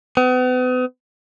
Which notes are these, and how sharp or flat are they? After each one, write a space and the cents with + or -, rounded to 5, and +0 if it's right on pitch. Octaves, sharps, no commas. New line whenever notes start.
B3 +40